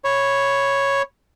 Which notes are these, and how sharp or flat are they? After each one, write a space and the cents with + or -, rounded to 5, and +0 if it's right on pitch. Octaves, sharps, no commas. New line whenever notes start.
C#5 +0 B5 +0